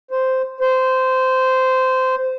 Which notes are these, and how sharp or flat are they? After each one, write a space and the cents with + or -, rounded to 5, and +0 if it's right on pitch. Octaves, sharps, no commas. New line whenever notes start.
C5 -5
C5 -15